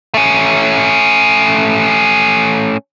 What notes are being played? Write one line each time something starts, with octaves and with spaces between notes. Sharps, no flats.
A3 C#4